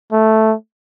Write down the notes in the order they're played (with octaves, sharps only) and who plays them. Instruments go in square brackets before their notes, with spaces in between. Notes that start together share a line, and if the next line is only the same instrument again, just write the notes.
[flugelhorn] A3